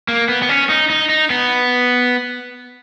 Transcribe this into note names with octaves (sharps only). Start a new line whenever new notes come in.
A#3
B3
B3
C#4
D#4
D#4
D#4
B3